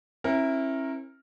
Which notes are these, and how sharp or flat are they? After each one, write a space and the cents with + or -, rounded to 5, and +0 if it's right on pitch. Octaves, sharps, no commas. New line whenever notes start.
C#4 -40 E4 +0 A#4 +0